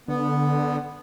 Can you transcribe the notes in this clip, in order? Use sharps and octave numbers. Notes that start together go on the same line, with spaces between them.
D3 B3